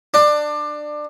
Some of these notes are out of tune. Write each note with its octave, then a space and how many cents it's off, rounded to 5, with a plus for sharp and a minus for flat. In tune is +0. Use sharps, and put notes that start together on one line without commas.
D4 +20